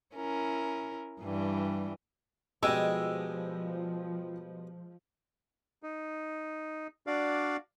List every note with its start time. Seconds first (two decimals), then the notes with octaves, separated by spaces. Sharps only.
0.15 C#4 E4 A#4
1.22 G2 E3 G3
2.63 B2 F3 G3 G#3 D#5 G5 E6
5.83 D#4
7.07 D4 F#4 D5 F5